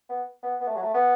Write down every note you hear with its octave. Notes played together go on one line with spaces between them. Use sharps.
B3
B3
B3
A3
F#3
A3
B3